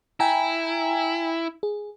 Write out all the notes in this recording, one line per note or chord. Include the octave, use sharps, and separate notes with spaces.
E4 G5 G#5 A#5
G#4